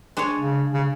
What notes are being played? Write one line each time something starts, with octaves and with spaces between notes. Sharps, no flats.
G#3 D4 G#4 C#5
C#3
C#3